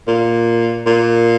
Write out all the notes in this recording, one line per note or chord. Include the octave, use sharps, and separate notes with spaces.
A#2
A#2